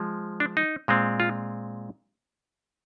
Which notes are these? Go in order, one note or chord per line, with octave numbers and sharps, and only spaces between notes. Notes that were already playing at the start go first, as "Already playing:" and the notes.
Already playing: F3 G#3
D4
D#4
A#2 G#3 C4
F4